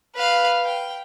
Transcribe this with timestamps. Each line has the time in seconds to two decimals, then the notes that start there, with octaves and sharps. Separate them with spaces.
0.16 B4 F5
0.65 G5